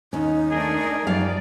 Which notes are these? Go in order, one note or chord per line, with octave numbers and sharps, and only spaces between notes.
D#2 C#4 D#4
A3 D4 G#4 A#4
F#2 F3 G3 D5 F5